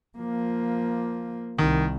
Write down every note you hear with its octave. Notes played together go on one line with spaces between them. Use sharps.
F3 A#3
C2 D#3